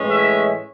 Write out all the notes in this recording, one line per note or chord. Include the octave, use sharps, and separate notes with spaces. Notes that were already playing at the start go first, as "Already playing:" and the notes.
Already playing: A2 E3 G#3 C#4
C#5 E5